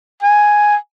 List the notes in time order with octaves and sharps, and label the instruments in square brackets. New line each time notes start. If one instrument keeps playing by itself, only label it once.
[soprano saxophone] G#5